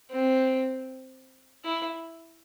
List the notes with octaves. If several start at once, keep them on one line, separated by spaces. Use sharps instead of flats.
C4
E4